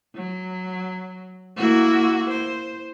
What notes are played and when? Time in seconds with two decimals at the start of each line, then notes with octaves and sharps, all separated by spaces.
0.15 F#3
1.57 A#3 E4 F#4
2.30 C5